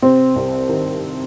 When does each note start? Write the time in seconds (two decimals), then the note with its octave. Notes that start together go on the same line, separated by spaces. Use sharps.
0.02 C3 C4
0.36 C2
0.69 D#3